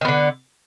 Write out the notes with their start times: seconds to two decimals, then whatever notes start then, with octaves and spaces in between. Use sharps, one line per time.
0.01 D#3
0.05 B3
0.08 D3